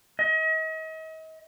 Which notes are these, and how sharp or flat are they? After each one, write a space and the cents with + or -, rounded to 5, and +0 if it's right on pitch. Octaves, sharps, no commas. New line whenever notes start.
D#5 +40